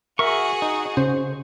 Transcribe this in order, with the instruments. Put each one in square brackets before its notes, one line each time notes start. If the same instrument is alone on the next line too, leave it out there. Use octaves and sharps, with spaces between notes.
[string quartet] F#4 G#4 [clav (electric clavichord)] A#4 E5 [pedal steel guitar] C#6
[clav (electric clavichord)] D#4
[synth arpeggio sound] C#3 [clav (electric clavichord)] C5